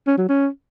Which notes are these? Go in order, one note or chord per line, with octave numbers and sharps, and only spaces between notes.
C#4
F#3
C#4